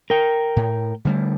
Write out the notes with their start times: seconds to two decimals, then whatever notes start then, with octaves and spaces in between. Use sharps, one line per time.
0.10 A#4 G5
0.56 A2
1.05 D3 G3 A3